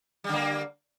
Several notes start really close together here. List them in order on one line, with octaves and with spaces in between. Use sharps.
G3 D3 A#3